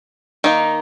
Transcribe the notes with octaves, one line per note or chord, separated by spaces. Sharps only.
D#3 A#3 D#4